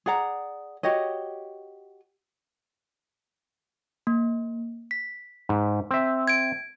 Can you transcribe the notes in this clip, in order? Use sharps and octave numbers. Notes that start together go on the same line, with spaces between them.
G#4 D5 F#5 A#5
F#4 G4 C#5 D#5
A#3
B6
G#2
C4 E5
G#6 D7